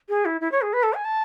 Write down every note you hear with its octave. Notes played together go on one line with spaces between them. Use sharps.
G#4
E4
E4
C#5
G#4
B4
A4
G#5
A5